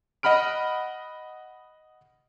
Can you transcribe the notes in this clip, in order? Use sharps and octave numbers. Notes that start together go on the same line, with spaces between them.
D#5 F#5 B5 F6 D7